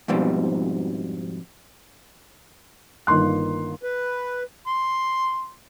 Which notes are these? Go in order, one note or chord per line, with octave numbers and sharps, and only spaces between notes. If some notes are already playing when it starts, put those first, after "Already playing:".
F2 G#2 B2 F3 G3
G1 D#3 A#3 C6 F#6
B4
C6